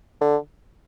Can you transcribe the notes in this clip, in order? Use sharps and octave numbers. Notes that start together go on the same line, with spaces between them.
D3